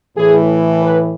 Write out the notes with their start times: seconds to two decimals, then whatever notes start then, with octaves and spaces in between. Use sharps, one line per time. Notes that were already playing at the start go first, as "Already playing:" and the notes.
0.17 A2 E3 G#4
0.81 B4